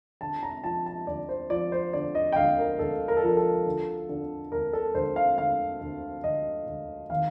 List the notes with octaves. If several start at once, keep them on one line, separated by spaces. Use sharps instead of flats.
D3 A5
A#5
F3 A5
A5
D2 D5
C5
F3 D5
C5
D3 D5
D#5
G5
D2 F5
A#4
D2 A4
A#4
A4
F3 A#4
A4
D3
D3
D2 A#4
A4
D2 C5
F5
D3 F5
D2
D2 D#5
D2
D#3 F5